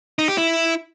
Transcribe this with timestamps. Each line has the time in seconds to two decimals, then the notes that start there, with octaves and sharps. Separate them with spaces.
0.19 D#4
0.28 G4
0.38 E4